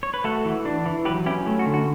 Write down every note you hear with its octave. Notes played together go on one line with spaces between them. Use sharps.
C#5
B4
A3 F#4 A4
E3
D4
E3
F#3 G4 B4
C#4 E4 G4
A3
F#4
D3
F#4